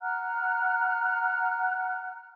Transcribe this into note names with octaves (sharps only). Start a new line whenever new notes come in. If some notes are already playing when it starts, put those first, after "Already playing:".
F#5 A#5 F6 F#6